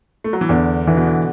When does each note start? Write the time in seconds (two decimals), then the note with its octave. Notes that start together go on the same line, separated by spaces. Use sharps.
0.24 A3
0.33 F#3
0.41 E3
0.49 E2 D3
0.87 D3 E3
0.97 B2
1.05 D3